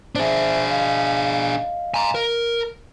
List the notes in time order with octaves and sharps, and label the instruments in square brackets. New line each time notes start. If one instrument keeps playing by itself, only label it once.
[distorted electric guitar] D4 G#4 [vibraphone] C5 E5
[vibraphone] D#5 F5
[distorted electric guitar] G#5 A#5
A#4